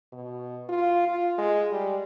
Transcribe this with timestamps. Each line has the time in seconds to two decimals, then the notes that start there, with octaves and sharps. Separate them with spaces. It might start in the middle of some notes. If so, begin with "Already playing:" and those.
0.13 B2
0.69 F4
1.08 F4
1.38 G#3
1.71 G3